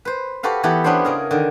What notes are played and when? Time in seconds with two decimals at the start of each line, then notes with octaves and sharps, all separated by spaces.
0.05 B4 C5
0.43 F#4 G4 A4 B4 F5
0.63 E3 B3 E4 G4 A4 B4
0.84 B3 C#4 D4 E4 C5
1.05 C#3 G#4 A#4
1.31 D3 D#3